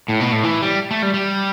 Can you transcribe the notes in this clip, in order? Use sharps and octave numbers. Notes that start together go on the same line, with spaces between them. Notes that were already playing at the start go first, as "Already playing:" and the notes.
A2
B2
A2
E3
G3
A3
G3
G3